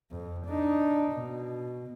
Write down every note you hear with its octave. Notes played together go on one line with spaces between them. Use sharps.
F2
D4 D#4
B2